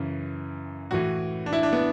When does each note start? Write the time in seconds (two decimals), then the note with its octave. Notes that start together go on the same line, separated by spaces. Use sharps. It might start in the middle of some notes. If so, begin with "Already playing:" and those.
Already playing: F#2 C#3 E3
0.91 A2 E3 F#4
1.46 D4
1.53 E4
1.63 D4
1.73 B3